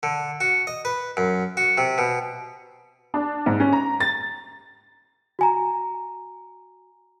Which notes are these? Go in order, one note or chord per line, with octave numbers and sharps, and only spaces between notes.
D3
F#4
D#5
B4
F#2
F#4
C3
B2
D4
G#2
C#4
A#5
A6
F#4 G#5 A#5